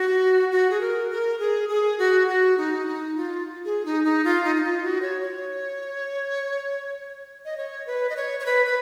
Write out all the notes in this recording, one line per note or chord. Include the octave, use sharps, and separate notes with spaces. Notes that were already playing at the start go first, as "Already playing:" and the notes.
Already playing: F#4
F#4
G#4
A#4
A#4
G#4
G#4
F#4
F#4
D#4
D#4
F4
G#4
D#4
D#4
F4
D#4
D#4
F4
F#4
C#5
C#5
D#5
C#5
B4
D#5
C#5
C#5
B4
B4